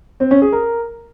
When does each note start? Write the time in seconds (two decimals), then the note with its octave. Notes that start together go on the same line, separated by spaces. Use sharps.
0.20 C4
0.31 C#4
0.42 G#4
0.52 A#4